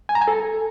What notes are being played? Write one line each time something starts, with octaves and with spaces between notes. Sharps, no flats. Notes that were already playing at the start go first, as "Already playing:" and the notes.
G#5
A#5
G#5
A4